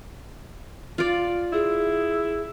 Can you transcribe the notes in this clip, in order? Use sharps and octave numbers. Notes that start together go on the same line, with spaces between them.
F4 D5
E4 G#4